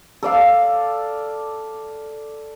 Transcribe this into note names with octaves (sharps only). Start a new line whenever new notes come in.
A4 D5 F5